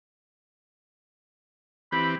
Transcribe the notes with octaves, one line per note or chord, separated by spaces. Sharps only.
E3 C4 G4 B5